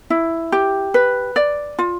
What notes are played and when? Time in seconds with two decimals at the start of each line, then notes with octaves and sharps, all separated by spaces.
0.10 E4
0.52 G4
0.94 B4
1.36 D5
1.79 F4